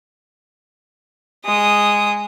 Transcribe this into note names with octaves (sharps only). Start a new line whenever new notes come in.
G#3 D#6